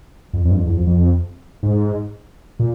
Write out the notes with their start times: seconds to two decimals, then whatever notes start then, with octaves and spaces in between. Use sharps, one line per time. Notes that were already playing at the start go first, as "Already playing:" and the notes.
0.33 F2
0.45 F2
0.51 G2
0.56 F2
0.66 E2
0.77 F2
0.87 F2
1.63 G#2
2.59 A#2